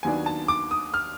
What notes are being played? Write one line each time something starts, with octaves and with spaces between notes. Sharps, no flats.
D#2 D#3 F#3 B3 D4 G#5
A5
D6
D#6
F6